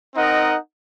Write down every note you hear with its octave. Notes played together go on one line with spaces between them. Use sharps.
C4 D#4 A#4 D#5 F#5